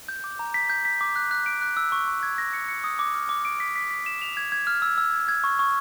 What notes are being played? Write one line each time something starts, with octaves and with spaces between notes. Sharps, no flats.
G6
D6
A#5
B6
G6
B6
D6
F#6
F#6
D7
F#6
E6
C#6
C#6
G#6
A#6
C#7
C#7
D#6
D6
F6
D6
D7
B6
B6
B6
E7
F7
G#6
G#6
F6
E6
E6
G#6
G#6
C#6
C#6